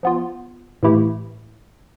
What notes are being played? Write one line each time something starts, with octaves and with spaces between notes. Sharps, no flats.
F3 B3 F4
A2 E3 A3 E4 G4